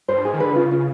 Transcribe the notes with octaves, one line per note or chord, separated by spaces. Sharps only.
G2 C5
G#2 G#4
D#3
D3 B4
C#3 F4
F4